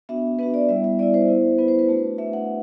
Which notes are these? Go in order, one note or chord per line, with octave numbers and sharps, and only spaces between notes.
B3 D4 F#4 E5
B3 D4 F#4 B4
D5
G3 B3 E4 E5
E5
G3 B3 E4 D5
C5
B3 E4
B3 E4 B4
C5
B4
A3 D4 F#4
A3 D4 F#4 E5
F#5